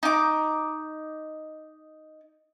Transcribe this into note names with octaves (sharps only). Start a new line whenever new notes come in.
D#4 D6